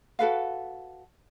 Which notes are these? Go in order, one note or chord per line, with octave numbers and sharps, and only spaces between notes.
F#4 A4 B4 F5